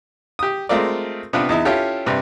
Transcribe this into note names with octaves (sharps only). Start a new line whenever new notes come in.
G4 D#6
G#3 A3 C4 F4 A#4 D5
C3 B3 D4 F4 B4
E2 D#4 E4
C#4 E4 F4 G4 A4
G2 C3 B4